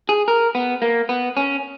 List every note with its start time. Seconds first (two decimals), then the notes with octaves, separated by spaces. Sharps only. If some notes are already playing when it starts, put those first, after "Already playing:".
0.09 G#4
0.28 A#4
0.55 B3
0.82 A#3
1.09 B3
1.37 C#4